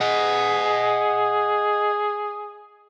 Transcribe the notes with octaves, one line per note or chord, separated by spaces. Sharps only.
G#4 D#5 F#5